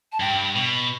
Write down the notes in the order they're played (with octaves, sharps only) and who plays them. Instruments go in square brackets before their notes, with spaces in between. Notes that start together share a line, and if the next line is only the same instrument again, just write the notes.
[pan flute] A5
[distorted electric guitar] G2 [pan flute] G5
[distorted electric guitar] B2